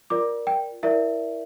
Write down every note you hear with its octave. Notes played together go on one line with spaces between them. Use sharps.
F4 A#4 D5 D6
G5
E4 A#4 D5 E5